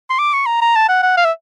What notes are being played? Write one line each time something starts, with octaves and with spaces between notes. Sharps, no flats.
C6
D6
C#6
A#5
A#5
A5
F#5
F#5
F5
E5